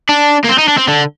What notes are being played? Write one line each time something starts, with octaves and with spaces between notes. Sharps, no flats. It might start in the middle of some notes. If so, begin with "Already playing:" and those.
D4
A#3
C4
D#4
D4
C4
D3